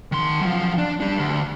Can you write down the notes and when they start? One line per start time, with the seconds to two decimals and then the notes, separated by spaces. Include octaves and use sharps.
0.12 D#3 C6
0.41 F#2 F3
0.78 D4
1.00 G3 D4
1.19 D2